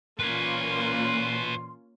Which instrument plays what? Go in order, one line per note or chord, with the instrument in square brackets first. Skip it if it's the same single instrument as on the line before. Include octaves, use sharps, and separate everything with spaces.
[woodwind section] A#2 E3 C6 [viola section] A#3 C#4 F4 [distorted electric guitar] B4 C#5